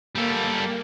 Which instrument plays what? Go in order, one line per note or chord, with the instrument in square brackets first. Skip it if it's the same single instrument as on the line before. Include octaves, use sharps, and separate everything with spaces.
[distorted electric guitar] G3 A4 [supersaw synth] A#3